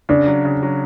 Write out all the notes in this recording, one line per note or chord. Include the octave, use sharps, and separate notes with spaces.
C#3 D4
F#3
C#3
F#3